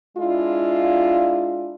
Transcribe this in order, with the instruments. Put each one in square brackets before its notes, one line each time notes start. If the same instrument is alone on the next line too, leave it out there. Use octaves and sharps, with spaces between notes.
[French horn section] G#3 D4 E4 F4